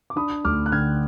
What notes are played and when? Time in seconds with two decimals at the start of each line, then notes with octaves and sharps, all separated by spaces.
0.10 D6
0.16 D4 B5 D#6
0.45 D2 D6 F6
0.66 F#6
0.72 D3 F6 G#6